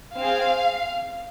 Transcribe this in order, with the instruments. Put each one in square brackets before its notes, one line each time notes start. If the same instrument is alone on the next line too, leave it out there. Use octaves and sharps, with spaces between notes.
[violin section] C4 G#4 F5